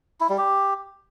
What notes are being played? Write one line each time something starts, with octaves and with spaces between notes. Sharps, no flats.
E4
G3
G4